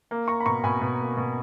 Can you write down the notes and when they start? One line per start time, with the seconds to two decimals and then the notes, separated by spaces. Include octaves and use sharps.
0.11 A#3
0.28 A#3 A#5 C#6
0.40 B5
0.45 B2 A#5 C#6
0.64 B2 G#5 B5
0.81 B2
1.00 A#3
1.17 B2